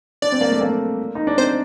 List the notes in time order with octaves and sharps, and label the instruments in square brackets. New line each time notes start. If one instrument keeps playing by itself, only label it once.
[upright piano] D4 [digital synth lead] D5
[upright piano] C4
A#3
A3
A#3
D#4
D4
[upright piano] C4 [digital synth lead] C5